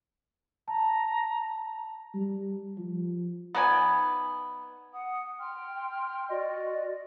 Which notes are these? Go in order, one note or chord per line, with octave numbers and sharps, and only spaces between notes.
A5 A#5
G3
F3
B3 D#4 D5 G#5
F#5 D#6
G5 C6 F6
F#4 D5 D#5